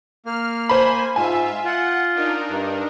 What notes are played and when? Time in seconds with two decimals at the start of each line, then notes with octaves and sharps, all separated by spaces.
0.26 A#3 F6
0.69 C5 G#5 B5
1.16 G#2 F4 E5 G#5
1.64 F4 F#5
2.14 D4 D#4 A#4
2.49 G2